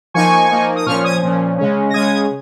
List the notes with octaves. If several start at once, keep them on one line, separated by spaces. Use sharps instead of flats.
F3 A#3 D#4 G#5 C#6
F3 A#3 D#4
D#6
A#2 F3 C#4 C#6 F6
D#6 G#6
A#2 F3 C#4
C#3 G#3 C#4
A#6
C#3 G#3 C#4 D#6 G#6